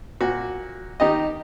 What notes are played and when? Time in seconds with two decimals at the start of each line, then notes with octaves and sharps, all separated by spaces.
0.21 A#2 F#4
1.00 D#3 D#4 G4 D#5